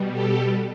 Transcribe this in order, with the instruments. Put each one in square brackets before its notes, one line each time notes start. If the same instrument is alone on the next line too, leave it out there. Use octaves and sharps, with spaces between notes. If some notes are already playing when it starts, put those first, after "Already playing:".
Already playing: [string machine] B2 G3
G4 A4